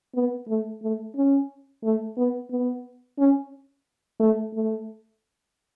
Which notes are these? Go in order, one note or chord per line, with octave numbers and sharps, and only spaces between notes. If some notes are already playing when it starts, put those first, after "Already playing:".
B3
A3
A3
C#4
A3
B3
B3
C#4
A3
A3